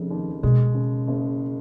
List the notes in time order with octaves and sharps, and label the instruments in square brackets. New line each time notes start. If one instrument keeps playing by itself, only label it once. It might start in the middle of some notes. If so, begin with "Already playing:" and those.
Already playing: [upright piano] F1 C#3 [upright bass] F3
[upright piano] D#2
[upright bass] B2 [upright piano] G#3
[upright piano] C#3
F#1